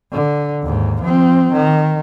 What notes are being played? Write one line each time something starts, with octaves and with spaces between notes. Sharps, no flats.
D3
D#2 G#2
F3 C4
D#3